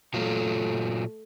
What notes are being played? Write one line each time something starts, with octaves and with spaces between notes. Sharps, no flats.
A#2 F#3 A3 F4